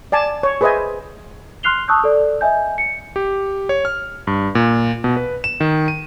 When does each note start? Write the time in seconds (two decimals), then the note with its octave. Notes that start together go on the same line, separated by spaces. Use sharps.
0.12 D5 G#5 A5
0.43 C#5
0.61 G#4 B4 C5 D#5 E5 G#5
1.63 C6 F6 F#6 C7 F7 G7
1.88 A5 C#6 D#6 E6 F#6 G6
2.04 A4 D5
2.41 D#5 E5 G#5 G6
2.78 C#7
3.16 G4
3.69 C#5
3.85 F6
4.27 G2
4.55 A#2
5.04 B2
5.16 B4
5.44 E7
5.60 D#3
5.88 D#7